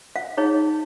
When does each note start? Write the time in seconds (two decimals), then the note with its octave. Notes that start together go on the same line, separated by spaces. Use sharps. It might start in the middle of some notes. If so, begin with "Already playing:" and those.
0.16 F5
0.37 D#4 G#4 C#5